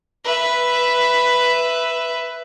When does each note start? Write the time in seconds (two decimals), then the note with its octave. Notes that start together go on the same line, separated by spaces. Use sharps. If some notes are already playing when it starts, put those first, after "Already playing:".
0.24 B4 E5